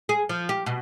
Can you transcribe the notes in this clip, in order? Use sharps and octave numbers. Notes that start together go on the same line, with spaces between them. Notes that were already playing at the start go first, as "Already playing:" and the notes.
G#4
F3
G4
B2